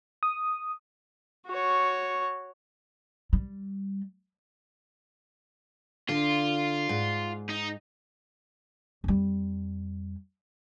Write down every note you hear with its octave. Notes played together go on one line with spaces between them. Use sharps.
D#6
F#4 C#5
G3
D3 F4
G#2
D#4
F2 G3